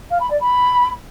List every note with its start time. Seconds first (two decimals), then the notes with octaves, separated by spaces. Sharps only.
0.10 F5
0.20 B5
0.30 D5
0.40 B5